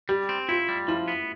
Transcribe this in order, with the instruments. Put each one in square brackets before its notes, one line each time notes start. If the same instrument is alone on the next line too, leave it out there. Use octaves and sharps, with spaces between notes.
[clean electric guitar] G3 [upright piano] G4
[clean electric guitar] C4
[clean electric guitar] E4 [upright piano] F4
[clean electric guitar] G3
[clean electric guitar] F3 [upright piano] E4
[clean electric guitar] B3